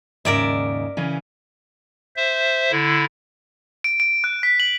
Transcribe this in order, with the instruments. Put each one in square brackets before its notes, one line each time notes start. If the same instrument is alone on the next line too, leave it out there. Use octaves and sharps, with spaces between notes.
[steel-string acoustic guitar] D#2 G#2 C#3 [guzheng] A#4 D5 E5
[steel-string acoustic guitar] C#3 E3 C#4
[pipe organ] C5 E5
D3 E4
[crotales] D7
D7
F#6
B6
F#7